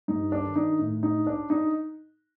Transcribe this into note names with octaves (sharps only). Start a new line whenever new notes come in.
G2 D#4
D4
D#3
D#4
A2
D#4
D4
D#4